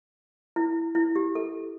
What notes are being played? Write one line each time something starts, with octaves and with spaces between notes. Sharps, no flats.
E4
E4
G4
A4